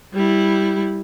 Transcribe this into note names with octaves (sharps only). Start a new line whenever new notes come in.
G3 E4